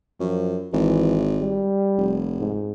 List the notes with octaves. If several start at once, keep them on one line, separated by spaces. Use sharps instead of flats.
F#2 F3
G#1 E3
G3
F1
G#2